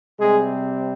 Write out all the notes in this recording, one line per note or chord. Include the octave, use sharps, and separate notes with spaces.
C3 G3 G#3 C4 G#4